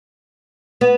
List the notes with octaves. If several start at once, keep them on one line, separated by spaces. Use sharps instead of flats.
B3